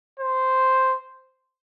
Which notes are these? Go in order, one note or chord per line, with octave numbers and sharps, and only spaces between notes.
C5